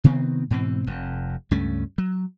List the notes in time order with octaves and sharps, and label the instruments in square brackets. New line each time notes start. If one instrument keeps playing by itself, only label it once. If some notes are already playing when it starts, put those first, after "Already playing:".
[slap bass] C3 D#3 B3 C4
G#2 B2 E3 C4
F1 F2
C#2 G2 A3 C#4
F#3